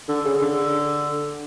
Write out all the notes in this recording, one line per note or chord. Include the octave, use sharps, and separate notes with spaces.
D3
C#3
D3